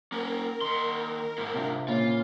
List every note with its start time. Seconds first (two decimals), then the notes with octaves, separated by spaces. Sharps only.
0.12 A#3 C#4 A#4
0.61 D#2 D#3 C6
1.38 G#2 E4
1.54 C3 D4 F4
1.88 A#2 C#3 F4